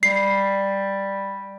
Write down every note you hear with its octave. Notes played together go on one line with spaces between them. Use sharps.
G3 C7